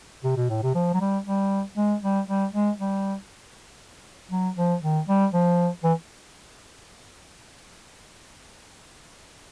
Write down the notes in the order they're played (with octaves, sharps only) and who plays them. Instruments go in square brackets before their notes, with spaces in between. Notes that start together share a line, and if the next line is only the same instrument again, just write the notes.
[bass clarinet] C3
B2
A2
C3
F3
F#3
G3
G3
G#3
G3
G3
G#3
G3
F#3
F3
D#3
G3
F3
E3